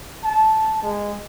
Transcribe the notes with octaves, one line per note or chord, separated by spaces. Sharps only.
A5
G#3